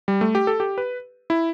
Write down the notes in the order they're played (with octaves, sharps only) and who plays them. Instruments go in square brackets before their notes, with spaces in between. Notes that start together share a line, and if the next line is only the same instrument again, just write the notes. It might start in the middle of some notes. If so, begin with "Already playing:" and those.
[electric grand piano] G3
A3
G4
A4
G4
B4
E4